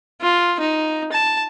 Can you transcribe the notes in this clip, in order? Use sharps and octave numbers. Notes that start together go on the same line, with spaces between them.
F4
D#4
A5